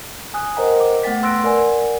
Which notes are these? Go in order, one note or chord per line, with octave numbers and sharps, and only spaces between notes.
G#5 D#6 F#6
A#4 C5 D#5 F#5 G5 A#5
D6
A3 B3 F#5 G5 A6 B6
B4 C6 E6 F#6 A#6 D7
A#4 D5 F#5 G#5